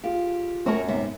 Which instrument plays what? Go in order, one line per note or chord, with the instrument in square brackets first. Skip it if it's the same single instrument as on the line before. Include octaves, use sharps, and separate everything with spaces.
[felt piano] F4 G#4 F5 [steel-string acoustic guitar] G4
[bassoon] F#2 [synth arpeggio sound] A3 C4 [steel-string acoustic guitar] F#4 A#4 C#5
[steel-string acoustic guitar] D2 C3 E5 [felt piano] G#2 B3